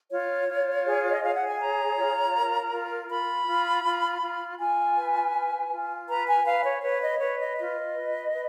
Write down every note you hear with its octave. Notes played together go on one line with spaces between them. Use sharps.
F4 C#5
F4
G#4
D#5
G#4 F5
F#5
G#5
C#5 A#5
F4
A#4
F4
F4 B5
F4
F4
F4
F4 G#5
B4
F4
F4
B4 A#5
G#5
B4 F5
C#5
B4 C#5
D#5
B4 C#5
D#5
F4 D#5
B4
B4